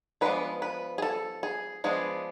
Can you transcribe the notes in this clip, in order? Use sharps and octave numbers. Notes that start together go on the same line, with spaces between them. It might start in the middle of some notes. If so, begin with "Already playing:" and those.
F3 G#3 B3 D4 B4
B4
G#4
A4
G#4
F3 G#3 B3 D4 G#4